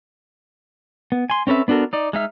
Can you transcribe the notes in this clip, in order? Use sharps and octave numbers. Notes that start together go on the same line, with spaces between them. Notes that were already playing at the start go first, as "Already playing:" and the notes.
B3
G#5 C6
C4 C#4 A4 B4 E5
B3 D4 F#4 A4 A#4
D#4 D5
G#3 D#4 E5 F6